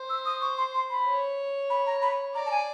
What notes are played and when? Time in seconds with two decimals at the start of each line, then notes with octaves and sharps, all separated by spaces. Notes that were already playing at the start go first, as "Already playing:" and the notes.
Already playing: C5
0.10 E6
0.26 D#6
0.42 C#6
0.57 C6
0.74 C6
0.90 B5
1.06 C#5
1.70 B5
1.86 A#5
2.02 B5
2.35 D5 A#5
2.46 A5
2.51 G#5